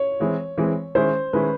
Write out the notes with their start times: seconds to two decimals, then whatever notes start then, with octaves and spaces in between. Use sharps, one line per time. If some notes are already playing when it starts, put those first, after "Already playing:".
Already playing: C#5
0.20 E3 G#3 C4 E4
0.58 E3 G#3 C4 E4
0.95 D#3 G#3 C#4 E4 C5
1.33 D#3 G#3 C#4 E4 B4